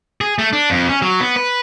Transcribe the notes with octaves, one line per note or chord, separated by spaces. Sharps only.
G#4
A3
D4
F2
C#4
F#3
B3
B4